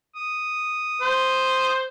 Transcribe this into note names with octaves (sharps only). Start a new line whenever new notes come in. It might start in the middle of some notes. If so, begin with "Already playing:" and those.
D#6
C5